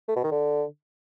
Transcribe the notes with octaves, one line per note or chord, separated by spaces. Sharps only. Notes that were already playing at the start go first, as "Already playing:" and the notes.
A3
B2
D#3
D3